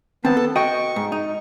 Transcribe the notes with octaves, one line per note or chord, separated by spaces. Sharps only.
D#3 B3 C4 A5
A4
F#4 D#5 G5 C#6
G#2
D#4